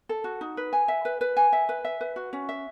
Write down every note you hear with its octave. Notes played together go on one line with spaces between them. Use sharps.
A4
F#4
D#4
B4
G#5
E5
B4
B4
G#5
E5
B4
E5
B4
F#4
C#4
E5